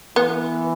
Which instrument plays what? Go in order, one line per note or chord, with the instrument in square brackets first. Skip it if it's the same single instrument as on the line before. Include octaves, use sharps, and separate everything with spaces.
[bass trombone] E3 [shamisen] B3